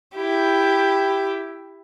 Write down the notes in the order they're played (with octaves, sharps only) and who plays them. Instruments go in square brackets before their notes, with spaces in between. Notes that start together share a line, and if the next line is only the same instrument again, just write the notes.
[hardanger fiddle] E4 G4